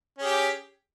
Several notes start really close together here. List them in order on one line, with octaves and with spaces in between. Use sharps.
C#4 G#4 G4